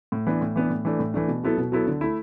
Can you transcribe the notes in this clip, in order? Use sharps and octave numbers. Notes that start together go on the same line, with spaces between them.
A2
E3 B3 D4
A2
E3 B3 D4
A2
E3 A3 D4
A2
E3 A3 D4
B2
F#3 B3 E4 A4
B2
F#3 B3 E4 A4
D3
A3 E4